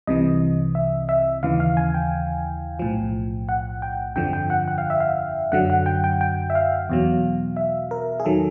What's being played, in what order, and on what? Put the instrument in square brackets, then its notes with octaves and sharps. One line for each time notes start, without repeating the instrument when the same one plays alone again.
[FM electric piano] C2 C3 E3 D#5
E5
E5
D#2 C#3 E3 F5
F5
G#5
G5
B1 A2 F3
F#5
G5
G1 F2 D3 F3 G5
G5
F#5
F#5
F5
E5
F5
F#2 D3 F#3 F#5
F#5
G5
G5
G5
E5
F5
E2 B2 F#3
E5
A#4
G#4
D#3 F#3 A4